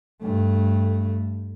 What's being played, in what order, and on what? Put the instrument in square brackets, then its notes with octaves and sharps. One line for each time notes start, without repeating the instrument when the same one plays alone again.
[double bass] G2 A3